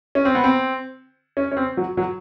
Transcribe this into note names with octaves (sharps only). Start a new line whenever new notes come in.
C#4
C4
B3
C4
C#4
C#4
C4
F#3
F#3